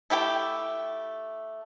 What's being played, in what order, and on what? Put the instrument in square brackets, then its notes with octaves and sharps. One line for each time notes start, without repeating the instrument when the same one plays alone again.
[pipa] A3 E4 G4 G5